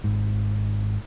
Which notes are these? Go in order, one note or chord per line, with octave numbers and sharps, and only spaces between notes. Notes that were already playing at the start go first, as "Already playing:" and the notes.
G#1 G#2